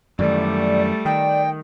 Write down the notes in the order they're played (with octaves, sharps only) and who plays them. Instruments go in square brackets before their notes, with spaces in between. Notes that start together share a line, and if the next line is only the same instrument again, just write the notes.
[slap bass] F#2 D#3 E3 [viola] G3 A3 [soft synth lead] D5
[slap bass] D#3 [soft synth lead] D5 [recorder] G5